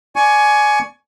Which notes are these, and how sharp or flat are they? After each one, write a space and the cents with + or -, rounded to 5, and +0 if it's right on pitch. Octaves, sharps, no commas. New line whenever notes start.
D5 +0 G#5 +20 C#6 +10